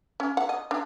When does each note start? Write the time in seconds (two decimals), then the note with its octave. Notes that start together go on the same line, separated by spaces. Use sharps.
0.20 C#4
0.37 F#5
0.49 D#5
0.71 D4